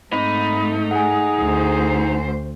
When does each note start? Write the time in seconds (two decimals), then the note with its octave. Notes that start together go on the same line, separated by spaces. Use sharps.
0.13 G#2 A3 C4 D#4 B5
0.91 G#4 F#5 G#5
1.39 D2 C5